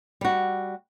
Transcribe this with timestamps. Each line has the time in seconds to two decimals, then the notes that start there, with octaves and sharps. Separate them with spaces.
0.21 G3 F#4